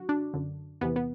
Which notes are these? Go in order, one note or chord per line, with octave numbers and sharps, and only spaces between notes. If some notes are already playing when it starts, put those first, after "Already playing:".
Already playing: F#2 D3 F#4
D4
F#2 D3
E2 C3 E3 B3
B3